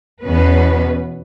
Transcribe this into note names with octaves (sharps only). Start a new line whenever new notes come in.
E2 B2 B3 C#4 B4